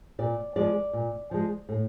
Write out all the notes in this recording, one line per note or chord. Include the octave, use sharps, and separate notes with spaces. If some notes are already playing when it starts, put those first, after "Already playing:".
A#2 D5
F3 G#3 D5
A#2
F3 G#3
A2